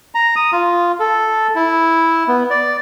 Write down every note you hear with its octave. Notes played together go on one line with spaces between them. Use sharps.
A#5
D#6
F4
A4
E4
B3
D5